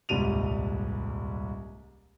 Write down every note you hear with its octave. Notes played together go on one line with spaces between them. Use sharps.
D#1 C2 G#2 G3 D#7 F7